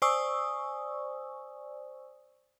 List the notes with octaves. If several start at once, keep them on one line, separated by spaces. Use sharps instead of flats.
C5 D5 G#5 C#6 D#6 E6